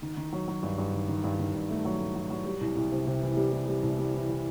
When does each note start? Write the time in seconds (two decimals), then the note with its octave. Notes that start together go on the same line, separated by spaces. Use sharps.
0.02 D#3
0.17 D#3
0.33 F#3
0.48 F#3
0.63 G2
0.78 G2
0.93 D#3
1.08 D#3
1.24 G2
1.39 D#3
1.54 G2
1.70 A3
1.85 F#3
2.00 A3
2.15 F#3
2.30 F#3
2.46 G3
2.61 C2
2.76 C2
2.92 C3
3.07 C3
3.22 E3
3.37 G3
3.53 G3
3.68 G3
3.83 C2
3.98 G3
4.14 E3
4.29 E3